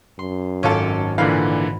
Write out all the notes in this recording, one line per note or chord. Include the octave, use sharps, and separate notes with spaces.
F#2 C6
G#1 C#4 F4 A4 D6
A#2 D3 E3 F5 B5